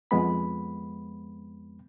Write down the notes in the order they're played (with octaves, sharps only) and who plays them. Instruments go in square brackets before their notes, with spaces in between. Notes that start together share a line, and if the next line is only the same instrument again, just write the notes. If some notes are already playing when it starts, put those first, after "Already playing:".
[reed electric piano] F2 G#3 B3 B5